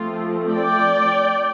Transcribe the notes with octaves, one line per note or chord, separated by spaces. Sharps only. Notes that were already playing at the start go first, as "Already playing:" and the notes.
Already playing: F3 A3 C4 F4
D5 G5